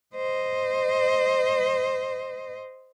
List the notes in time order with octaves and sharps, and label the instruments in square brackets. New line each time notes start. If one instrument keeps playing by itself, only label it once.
[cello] C5 D#5